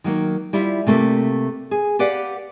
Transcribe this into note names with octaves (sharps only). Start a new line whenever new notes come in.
D#3 F#3 A#3
G3 E4 F4
C3 A3 A#3 A4
G#4
G4 B4 D5 F5 F#5